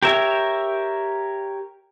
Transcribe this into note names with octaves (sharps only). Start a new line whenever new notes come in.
G4 A#4 C#5 E5